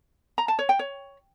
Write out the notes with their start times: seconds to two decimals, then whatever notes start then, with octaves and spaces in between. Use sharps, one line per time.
0.38 A#5
0.48 A5
0.59 C#5
0.69 G5
0.79 C#5